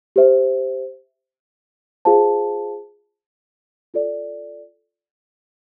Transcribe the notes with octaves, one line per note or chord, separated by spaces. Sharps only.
G4 C5 E5
F4 G#4 C5 F5 A5
F4 A4 D5